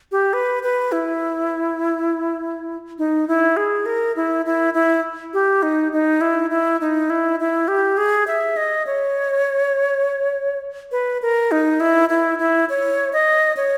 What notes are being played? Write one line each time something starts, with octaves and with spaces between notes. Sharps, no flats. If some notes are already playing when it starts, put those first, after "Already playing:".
G4
B4
B4
E4
D#4
E4
G#4
A#4
E4
E4
E4
G4
D#4
D#4
E4
E4
D#4
E4
E4
G4
G#4
E5
D#5
C#5
B4
A#4
D#4
E4
E4
E4
C#5
D#5
C#5